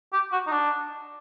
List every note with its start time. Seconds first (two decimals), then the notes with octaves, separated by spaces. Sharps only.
0.13 G4
0.32 F#4
0.47 D#4
0.52 D4